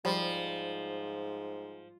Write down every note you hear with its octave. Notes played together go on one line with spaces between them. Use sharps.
G#2 F3 G3